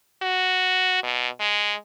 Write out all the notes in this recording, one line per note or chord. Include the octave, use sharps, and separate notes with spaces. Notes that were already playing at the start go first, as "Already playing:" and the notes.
F#4
B2
G#3